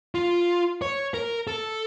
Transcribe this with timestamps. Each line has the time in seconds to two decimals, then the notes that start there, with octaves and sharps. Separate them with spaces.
0.15 F4
0.82 C#5
1.14 A#4
1.47 A4